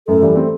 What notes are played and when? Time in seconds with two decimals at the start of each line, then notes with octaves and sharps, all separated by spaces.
0.08 F#2 A2 A4
0.22 E3 G3
0.36 A3 C4